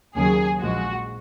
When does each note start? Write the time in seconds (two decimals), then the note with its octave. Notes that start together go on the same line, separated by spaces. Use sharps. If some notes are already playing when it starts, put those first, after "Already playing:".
0.15 D#2 C#3 F#3 G#4
0.61 A#1 A#2 F3 G#3 F#4